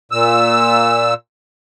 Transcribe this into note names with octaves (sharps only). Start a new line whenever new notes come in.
A#2 E6